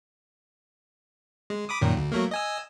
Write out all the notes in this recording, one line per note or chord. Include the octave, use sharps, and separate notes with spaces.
G#3
B5 D6 D#6
F#2 A#2 D#3
D2
F#3 A3 A#3
D#5 G#5 E6